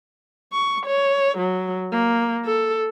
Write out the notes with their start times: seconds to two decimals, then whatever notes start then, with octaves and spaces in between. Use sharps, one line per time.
0.53 C#6
0.86 C#5
1.38 F#3
1.92 A#3
2.46 A4